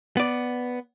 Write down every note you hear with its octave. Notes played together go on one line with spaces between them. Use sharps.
B3 D5